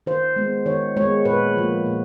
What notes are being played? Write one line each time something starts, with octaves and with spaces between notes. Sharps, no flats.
D#3 C5
G#3 B3
D#3 C#5
G#3 B3 C#5
A#2 B4
F3 A#3
A#2